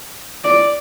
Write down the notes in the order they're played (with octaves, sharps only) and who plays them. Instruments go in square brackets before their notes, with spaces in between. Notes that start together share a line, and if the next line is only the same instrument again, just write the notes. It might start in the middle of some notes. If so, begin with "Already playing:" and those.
[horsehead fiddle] D5